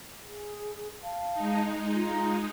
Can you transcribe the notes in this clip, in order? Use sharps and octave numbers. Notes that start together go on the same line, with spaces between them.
G#4
F5 A5
G#3 D#4
F4 A#5